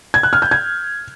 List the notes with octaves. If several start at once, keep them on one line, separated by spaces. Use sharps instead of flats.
G#6
F#6
F6
G6
G#6